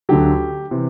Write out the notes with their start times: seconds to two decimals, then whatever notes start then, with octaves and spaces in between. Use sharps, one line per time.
0.09 D2 D3 F#3 G4
0.71 C3 E3